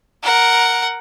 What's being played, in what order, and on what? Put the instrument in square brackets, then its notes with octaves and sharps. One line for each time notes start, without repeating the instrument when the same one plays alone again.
[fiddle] A#4 F#5